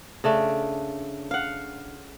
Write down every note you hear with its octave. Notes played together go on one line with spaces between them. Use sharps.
C#3 A3 D4
F5 F#5